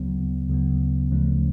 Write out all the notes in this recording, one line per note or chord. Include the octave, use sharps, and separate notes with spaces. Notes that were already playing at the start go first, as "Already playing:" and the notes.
Already playing: D2 C#3 F#3 B3
D2 C#3 F#3 B3
D2 C#3 F3 A3 C#4